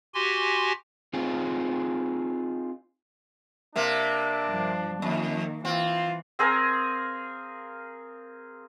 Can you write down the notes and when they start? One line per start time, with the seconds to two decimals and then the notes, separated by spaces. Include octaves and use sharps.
0.14 F#4 G4 G#5 C6
1.13 C4 D#4 F4 G#4
3.76 C3 A#3 D4
4.46 G2 F3
5.02 F2 D#3 A#3
5.65 E3 C4 F4
6.39 C4 G#4 A#4 F5